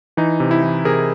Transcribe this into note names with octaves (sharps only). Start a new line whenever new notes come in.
E3 D#4
C3
E4
E3
C3 G#4 A#4